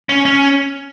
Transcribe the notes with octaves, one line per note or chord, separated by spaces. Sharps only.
C#4
C#4